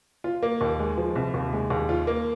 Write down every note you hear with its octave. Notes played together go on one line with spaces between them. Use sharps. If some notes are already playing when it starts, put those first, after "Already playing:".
F4
A#3
D#2
G#3
F3
C2
D#2
G#3
D#2
F4
A#3